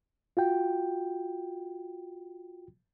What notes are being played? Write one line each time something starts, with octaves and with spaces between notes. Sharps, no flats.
F4 F#4 G5